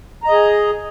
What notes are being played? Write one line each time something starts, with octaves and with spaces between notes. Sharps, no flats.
G#4 D#5 A#5